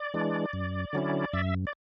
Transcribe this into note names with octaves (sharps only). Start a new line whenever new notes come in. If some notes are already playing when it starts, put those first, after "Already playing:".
Already playing: D5
E3 G#3 D4
F#2
D3 F#3 C#4 E4
F#2 E5
D5